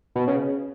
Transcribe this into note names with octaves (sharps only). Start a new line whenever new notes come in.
B2
C#3